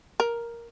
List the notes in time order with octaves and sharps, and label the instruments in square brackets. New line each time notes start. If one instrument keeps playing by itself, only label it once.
[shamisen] A#4